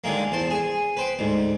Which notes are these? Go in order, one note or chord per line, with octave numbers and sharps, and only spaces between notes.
D#2 D3 D#3 G#3 A#3
E2 C5 A5
G#4 G#5
B4 C5 G5
D2 G#2